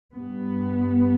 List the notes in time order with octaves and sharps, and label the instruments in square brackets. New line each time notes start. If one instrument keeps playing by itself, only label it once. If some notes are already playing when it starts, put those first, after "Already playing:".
[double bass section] G2 B3